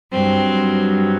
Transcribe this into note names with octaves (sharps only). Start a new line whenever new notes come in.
G2 F#3 C4